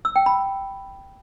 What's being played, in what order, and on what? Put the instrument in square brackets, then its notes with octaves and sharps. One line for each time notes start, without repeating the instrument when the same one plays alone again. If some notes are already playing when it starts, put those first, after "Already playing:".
[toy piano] E6
G5
B5